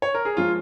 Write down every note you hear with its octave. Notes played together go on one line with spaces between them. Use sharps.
C#5
A#4
G#4
F3 G#3 F4